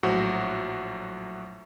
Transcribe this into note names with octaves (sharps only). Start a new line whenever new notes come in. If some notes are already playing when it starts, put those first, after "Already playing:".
A#1 A2 F#3 F#4 C5